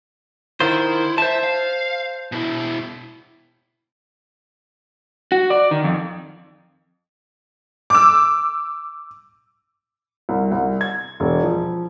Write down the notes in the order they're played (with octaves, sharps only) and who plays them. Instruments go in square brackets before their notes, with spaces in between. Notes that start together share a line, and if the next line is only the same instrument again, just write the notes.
[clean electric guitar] D#3 F4 C5 [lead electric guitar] E4
[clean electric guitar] C5 A5 [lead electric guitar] E5
[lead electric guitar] F5
B2 E4
[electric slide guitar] F#4
D5
D#3
F2
[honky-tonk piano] D6 E6
[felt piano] C2
C2
G#6
E1
F3